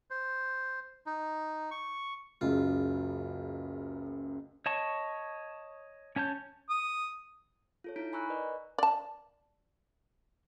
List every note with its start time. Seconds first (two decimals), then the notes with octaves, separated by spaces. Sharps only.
0.11 C5
1.06 D#4
1.71 C#6
2.41 F#1 C#2 F#2 F4
4.66 C#5 D#5 A5 C#6
6.16 C#4 C#5 A5 G6
6.70 D#6
7.84 F4 A4 C#5
7.96 D#4 E4 A#5 G6 B6 D7
8.13 G#5 A#5 B5 C#6 E6 F#6
8.30 A#4 B4 D5 D#5
8.78 D5 A5